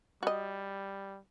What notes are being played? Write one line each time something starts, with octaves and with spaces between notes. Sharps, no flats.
G3 F#4 D#5